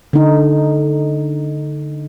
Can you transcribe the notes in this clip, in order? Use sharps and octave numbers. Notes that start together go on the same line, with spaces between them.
D3 D#4